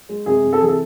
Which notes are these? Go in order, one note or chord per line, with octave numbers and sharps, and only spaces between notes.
G#3
C3 G#4
C3
A4
E3 G#4
A4